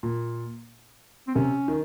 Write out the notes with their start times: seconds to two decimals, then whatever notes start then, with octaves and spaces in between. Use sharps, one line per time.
0.03 A#2
1.27 C4
1.35 C3 C#4
1.68 D#3